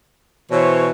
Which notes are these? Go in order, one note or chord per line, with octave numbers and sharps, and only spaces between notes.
B2 E3 C5 C#5